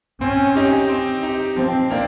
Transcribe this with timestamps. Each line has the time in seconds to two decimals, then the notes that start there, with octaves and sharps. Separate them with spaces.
0.21 C4 C#4
0.55 D#4 G4
0.89 C4
1.23 D#4 G4
1.56 F3 C4
1.91 A#3 D4